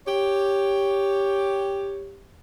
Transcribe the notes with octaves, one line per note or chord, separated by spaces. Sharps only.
G4 C#5